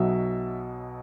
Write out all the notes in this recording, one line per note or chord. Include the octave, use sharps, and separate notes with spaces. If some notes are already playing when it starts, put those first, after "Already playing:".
Already playing: B1 B2 F#3 E5